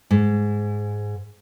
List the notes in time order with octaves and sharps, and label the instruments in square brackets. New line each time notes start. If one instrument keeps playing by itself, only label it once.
[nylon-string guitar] G#2